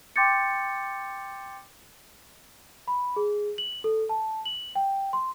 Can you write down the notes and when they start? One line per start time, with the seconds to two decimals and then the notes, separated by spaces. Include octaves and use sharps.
0.16 G5 C6 D6 G6 A6 C#7
2.88 B5
3.16 G#4
3.58 F#7
3.84 A4
4.09 A5
4.45 F#7
4.75 G5
5.13 C6